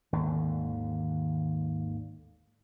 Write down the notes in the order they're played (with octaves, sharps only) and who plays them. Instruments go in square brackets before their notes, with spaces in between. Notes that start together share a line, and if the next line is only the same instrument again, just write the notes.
[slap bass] G#1 D#2 D3